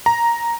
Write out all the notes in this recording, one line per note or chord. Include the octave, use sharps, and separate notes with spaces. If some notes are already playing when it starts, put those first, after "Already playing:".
A#5